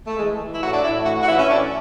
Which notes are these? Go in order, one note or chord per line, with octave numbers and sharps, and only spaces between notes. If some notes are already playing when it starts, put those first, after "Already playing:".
A3
E3 G#3
E3
E4
A2 F#4
D4
A2 E4
E3 F#4
F#4
E3 E4
C#4
A2 D4